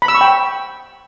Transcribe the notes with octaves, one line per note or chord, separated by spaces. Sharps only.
B5
E6
C#6
G5